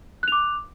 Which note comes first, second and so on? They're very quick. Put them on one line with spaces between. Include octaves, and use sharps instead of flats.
F#6 F7 D6